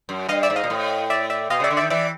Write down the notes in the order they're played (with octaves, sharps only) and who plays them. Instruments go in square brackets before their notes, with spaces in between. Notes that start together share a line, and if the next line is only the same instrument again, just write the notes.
[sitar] F#2
[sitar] G2 [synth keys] D#5 F5
[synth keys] D5 E5
[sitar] G#2
[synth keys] D#5 F5
[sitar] A#2
A2
[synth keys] D5 E5
D5 E5
[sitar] B2 [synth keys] D#5 F5
[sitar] C#3 [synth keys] D5 E5
[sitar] D3
[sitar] D#3 [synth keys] D5 E5
[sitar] E3 [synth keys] D5 E5